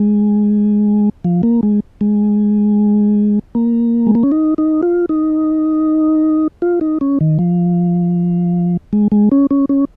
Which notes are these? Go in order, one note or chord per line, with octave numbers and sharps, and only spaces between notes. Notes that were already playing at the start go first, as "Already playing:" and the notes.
Already playing: G#3
F3
A#3
G#3
G#3
A#3
G#3
A#3
C#4
D#4
D#4
F4
D#4
F4
D#4
C#4
D#3
F3
G#3
G#3
C#4
C#4
C#4